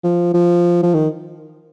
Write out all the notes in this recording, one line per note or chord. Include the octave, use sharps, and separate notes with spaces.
F3
F3
F3
D#3